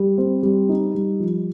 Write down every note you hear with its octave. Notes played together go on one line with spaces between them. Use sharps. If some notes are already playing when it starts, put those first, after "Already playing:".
Already playing: G3
C4
G3
D#4
G3
F3